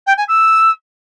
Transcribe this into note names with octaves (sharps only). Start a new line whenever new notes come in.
G5
G#5
E6